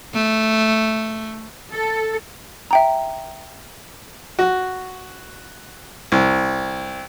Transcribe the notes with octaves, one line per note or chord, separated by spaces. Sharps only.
A3
A4
E5 G5 A#5
F#4
C2